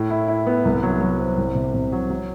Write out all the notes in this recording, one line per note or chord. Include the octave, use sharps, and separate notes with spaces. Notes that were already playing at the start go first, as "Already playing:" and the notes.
Already playing: A2
E4
E4
B3
C2
F#3
F#3
C4
C2
C3
C3
F#3
F#3